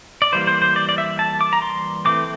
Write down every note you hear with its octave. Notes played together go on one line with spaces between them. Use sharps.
D5
E3 G3 A#3 C5
C5
C5
D5
D5
E5
A5
D6
A#5
C6
E3 A3 C4 D6